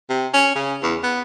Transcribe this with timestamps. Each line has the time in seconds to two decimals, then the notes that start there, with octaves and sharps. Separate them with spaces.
0.10 C3
0.34 C#4
0.56 C#3
0.83 E2
1.04 B3